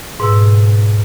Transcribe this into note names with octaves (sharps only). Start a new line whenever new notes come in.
G#2 B2 E6